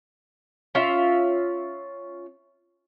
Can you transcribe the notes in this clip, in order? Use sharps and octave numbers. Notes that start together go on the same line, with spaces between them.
C#4 F4 E5